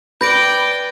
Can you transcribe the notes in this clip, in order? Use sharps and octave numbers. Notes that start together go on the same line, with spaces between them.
B4 D5 G5 G6 A#6 D7